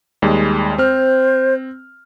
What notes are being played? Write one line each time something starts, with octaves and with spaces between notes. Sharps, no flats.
D#2 G3 G#3
C4 C5 F6